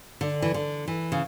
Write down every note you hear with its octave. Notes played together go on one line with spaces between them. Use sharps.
D3
E3
D3
E3
C#3